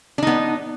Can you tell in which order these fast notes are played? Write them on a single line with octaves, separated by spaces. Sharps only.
D4 D#4 B3